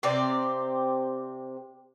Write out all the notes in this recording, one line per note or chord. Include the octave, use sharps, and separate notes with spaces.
C3 C4 G4 D5